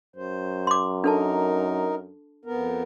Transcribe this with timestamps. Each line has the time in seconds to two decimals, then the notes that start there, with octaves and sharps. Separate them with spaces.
0.16 F#2 C5
0.67 C6 D6
1.04 D4 D#4 A4 A#4 A5
2.45 F2 B3 A#4